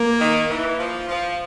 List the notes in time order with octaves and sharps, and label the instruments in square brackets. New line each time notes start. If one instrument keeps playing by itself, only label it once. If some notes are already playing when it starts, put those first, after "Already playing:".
Already playing: [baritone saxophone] A#3
[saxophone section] D#3
E3
F3
F3